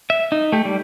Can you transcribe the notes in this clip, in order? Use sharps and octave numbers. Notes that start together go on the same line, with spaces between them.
E5
D#4
A3 G4
G3